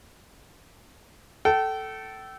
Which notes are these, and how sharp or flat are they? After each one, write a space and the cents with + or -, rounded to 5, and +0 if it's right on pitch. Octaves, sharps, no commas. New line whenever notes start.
A4 -5 G5 -35